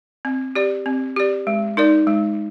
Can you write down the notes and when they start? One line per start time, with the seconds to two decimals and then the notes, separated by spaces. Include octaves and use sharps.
0.25 C4
0.55 G4 D5
0.86 C4
1.16 G4 D5
1.47 G#3
1.77 D#4 A#4 D5
2.07 G#3